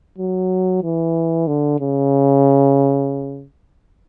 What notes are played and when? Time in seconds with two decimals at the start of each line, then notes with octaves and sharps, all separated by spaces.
0.19 F#3
0.83 E3
1.47 D3
1.80 C#3